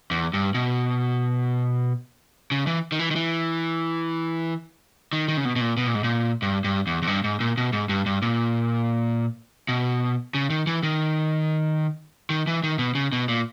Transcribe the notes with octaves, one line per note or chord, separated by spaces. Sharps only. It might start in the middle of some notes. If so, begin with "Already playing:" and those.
E2
G2
B2
C#3
E3
D#3
E3
D#3
E3
D#3
D#3
C#3
B2
B2
A#2
B2
A#2
G#2
A#2
G2
G2
E2
E2
G2
G#2
A#2
B2
G#2
G2
G2
A#2
B2
C#3
D#3
E3
D#3
D#3
E3
D#3
B2
C#3
B2
A#2